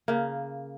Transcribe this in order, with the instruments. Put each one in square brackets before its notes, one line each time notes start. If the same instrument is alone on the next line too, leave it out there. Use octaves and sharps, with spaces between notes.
[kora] C#3 A#3